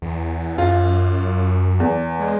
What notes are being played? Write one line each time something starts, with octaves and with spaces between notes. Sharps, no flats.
E2
F#2 F4
E2
G#3